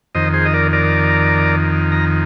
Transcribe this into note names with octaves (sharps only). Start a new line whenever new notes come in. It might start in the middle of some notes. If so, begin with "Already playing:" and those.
F2 D#3 C5 D#5
G#4 C5
D#5
A#4 D5
A#4 D5
A#5